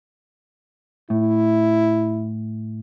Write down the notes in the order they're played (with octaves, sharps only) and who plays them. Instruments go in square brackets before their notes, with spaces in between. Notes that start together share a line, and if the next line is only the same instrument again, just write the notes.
[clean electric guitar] A2 [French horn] E4